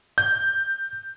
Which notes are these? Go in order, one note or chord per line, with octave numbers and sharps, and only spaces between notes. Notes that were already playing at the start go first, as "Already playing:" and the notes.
G6